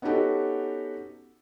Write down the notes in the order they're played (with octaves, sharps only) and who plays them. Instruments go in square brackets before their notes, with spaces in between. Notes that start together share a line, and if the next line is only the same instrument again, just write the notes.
[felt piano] B3 C#4 D#4 F#4 G4 A4